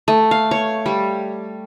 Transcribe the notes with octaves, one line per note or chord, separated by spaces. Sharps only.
A3
F5
C#5
G3